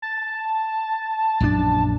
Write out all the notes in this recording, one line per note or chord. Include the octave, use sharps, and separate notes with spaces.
A5
A#1 F#2 D4